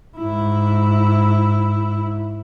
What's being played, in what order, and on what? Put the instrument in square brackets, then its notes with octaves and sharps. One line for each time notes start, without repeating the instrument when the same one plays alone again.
[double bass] G#2 E4